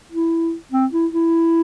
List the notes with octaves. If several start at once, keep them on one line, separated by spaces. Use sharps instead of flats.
E4
C4
E4
E4